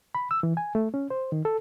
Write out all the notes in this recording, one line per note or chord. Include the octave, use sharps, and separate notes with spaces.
B5
E6
E3
G#5
A3
C#4
C5
D#3
A4